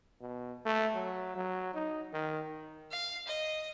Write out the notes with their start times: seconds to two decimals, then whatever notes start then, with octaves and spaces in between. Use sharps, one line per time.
0.21 B2
0.66 A3
0.95 F#3
1.36 F#3
1.74 D#4
2.13 D#3
2.91 F5
3.27 D#5